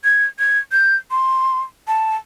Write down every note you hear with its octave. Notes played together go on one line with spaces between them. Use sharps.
G#6
G#6
G6
C6
A5